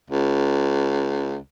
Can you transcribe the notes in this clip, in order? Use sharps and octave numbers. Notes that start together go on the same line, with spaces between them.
C#2